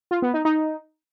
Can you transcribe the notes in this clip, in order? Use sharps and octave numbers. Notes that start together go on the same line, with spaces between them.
F4
B3
D#4
D#4